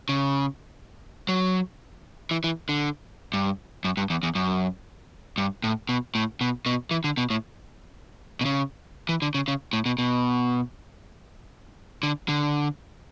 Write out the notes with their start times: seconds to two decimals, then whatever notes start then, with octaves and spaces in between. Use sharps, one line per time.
0.09 C#3
1.29 F#3
2.31 E3
2.44 E3
2.69 D3
3.33 G2
3.85 F#2
3.97 G2
4.10 E2
4.23 E2
4.35 F#2
5.38 G2
5.64 A2
5.89 B2
6.15 A2
6.41 B2
6.66 B2
6.91 E3
7.04 D3
7.17 B2
7.30 A2
8.41 B2
8.45 C#3
9.09 E3
9.22 D3
9.35 C#3
9.48 C#3
9.73 A2
9.86 B2
9.98 B2
12.03 D3
12.29 D3